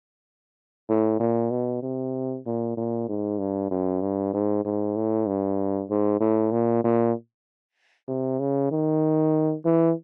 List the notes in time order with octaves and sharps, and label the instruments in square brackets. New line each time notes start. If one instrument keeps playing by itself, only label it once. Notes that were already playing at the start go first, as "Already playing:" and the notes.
[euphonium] A2
A#2
B2
C3
A#2
A#2
G#2
G2
F#2
G2
G#2
G#2
A2
G2
G#2
A2
A#2
A#2
C3
C#3
D#3
E3